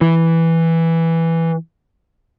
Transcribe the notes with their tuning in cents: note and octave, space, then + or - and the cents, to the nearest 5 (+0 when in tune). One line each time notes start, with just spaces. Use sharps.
E3 +0